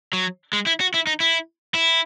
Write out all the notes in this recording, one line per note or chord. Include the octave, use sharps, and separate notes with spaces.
F#3
G#3
E4
F#4
E4
D#4
E4
E4